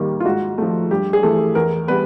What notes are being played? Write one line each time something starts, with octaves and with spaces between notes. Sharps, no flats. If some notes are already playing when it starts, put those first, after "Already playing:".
Already playing: D#2 D#3 G3 A#3
F4
G#2 F#4
F3 A3
G2 G4
G#4
E3 A3 A4
E2 A#4
G3 B3 B4